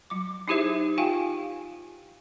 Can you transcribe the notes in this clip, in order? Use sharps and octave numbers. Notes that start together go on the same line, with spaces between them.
F#3 D6
D#4 E4 G4 G#4 C5 E5
F4 G4 F5 G5 G#5